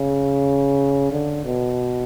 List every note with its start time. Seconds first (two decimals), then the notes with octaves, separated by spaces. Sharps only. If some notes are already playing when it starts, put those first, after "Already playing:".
Already playing: C#3
1.12 D3
1.45 B2